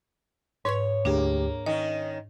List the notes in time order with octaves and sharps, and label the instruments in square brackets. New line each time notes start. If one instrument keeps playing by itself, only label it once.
[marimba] G#2 B4 C#6 [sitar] C#5
[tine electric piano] D2 G4 [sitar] A#3 [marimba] D4 G#4
[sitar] D#3 C#4 [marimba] C#5 [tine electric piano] D#5